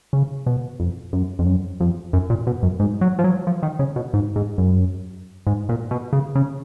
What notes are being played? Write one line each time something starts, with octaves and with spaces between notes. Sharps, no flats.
C#3
B2
F2
F#2
F2
F#2
F2
F#2
A#2
B2
F#2
G#2
F#3
F3
F#3
F3
D#3
C#3
B2
G#2
G#2
F#2
G#2
A#2
B2
C#3
C#3